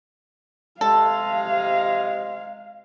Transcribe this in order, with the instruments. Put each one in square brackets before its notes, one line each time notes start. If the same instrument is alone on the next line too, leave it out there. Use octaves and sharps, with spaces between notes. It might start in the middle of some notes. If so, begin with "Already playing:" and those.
[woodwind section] C3 G#3 [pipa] A4 [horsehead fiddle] F5